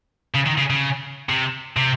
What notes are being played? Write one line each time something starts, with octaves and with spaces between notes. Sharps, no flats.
C#3
D#3
C#3
C#3
C3
C3